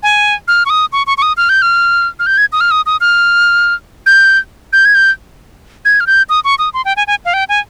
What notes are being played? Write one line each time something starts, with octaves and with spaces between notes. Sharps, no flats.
G#5
F6
C#6
D#6
C#6
C#6
C#6
D#6
F6
G6
F6
F6
G6
G#6
D#6
F6
D#6
D#6
F6
G6
G6
G#6
G6
G#6
F6
G6
D#6
C#6
D#6
C6
G5
G#5
G#5
F5
G5
G#5